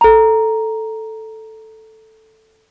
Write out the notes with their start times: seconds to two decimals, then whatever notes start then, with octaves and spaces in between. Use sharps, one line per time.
0.01 A4 A#5